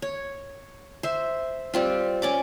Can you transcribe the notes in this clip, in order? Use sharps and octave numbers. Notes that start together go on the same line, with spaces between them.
C#5
C5 E5
G3 C4 F4
C#4 D5 D6